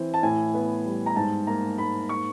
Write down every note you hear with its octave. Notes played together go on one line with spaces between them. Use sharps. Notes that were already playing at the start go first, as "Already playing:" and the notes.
Already playing: E3 C4
A5
A2 G#5
B3
G3
A#5
G#2 A5
A#3 A#5
G#2 B5
C#6